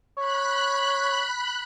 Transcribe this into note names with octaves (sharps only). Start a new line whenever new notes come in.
C#5 B5 F#6